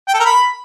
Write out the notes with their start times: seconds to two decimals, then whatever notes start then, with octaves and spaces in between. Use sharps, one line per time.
0.08 G5
0.14 A4
0.20 A#4
0.25 B5